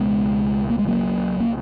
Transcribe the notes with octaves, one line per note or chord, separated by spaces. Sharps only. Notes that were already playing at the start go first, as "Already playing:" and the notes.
Already playing: C#2 B2 G#3 B3
A#3
G#3
F#3 A#3
A#3